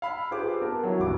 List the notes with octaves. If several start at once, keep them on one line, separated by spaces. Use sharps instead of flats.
F5 B5 E6
F4 G4 G#4 B4 C5 D6
B3 A#4 A5
F#3 E4 F#4
D1 C#2 G2 E3 D6